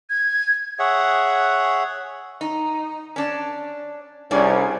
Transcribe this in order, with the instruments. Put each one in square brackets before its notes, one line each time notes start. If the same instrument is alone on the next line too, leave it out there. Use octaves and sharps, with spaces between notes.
[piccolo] G#6
[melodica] G#4 C#5 E5 F#5
[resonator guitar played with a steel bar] D#4
C#4 D4
[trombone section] C2 C#4 [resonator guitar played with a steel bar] D4 G#4 D5